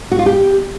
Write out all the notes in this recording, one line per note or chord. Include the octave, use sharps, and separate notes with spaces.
F#4
F4
G4